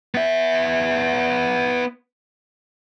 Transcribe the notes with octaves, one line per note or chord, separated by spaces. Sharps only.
B3 E5